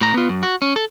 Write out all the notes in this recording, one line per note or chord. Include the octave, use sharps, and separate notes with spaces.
A2 A#5
B3 F4
F#2
F#4
C#4
A4